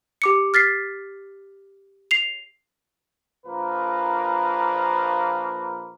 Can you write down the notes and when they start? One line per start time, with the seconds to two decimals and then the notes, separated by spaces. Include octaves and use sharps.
0.22 G4 D6 C#7
0.54 F6 A6 B6 C7
2.11 C7 F7
3.46 A#1 F3 A#3 A#4 B4